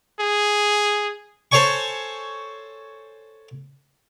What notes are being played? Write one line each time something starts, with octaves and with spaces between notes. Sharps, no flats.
G#4
A4 C5 C#5 G#5 C#6